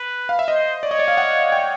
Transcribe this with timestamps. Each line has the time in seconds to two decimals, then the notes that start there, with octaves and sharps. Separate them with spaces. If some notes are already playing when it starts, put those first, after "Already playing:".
Already playing: B4
0.29 F5
0.39 E5
0.48 C5 D#5
0.83 C#5 D5
0.91 D#5
0.99 D5
1.08 F5
1.17 F#5
1.52 G5